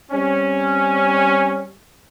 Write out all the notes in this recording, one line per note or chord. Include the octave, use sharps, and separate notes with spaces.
G3 C4 C#4